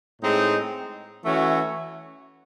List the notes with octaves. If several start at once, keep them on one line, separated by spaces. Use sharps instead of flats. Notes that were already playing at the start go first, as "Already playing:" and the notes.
A2 G#3 C4 D#4
E3 A3 C#4 F#4